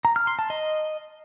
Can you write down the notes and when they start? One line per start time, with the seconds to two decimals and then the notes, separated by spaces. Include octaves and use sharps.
0.05 A#5
0.16 F6
0.27 C6
0.39 A5
0.50 D#5